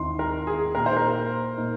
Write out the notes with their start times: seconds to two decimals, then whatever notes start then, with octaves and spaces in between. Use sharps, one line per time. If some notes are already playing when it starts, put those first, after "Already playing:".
Already playing: D#2 D#3 C4 D#4 C6
0.19 A#4
0.47 G#4
0.75 A#2 A#3 D#4 A#4
0.86 C5
0.97 A#4
1.58 A#2 A#3 D#4